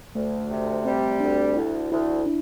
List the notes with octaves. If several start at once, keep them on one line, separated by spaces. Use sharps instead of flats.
D2 A3
C3
G3 C4
D2 D4
D2 E4
D2 E4
D4